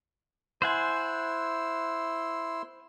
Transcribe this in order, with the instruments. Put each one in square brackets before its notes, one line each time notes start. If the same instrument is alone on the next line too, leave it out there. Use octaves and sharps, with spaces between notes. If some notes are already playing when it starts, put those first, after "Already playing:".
[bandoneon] E4 C6 E6 [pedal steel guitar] C5 F#5 G#5